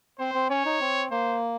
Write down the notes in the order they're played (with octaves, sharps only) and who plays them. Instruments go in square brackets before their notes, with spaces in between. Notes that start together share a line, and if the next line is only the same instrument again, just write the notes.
[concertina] C4 [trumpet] C5
[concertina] C4
[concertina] C#4 [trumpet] C#5
[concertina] D#4
C4
[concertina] A#3 [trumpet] C5